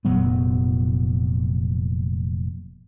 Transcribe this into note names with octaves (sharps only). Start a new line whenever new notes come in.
F1 A#2 F#3 B3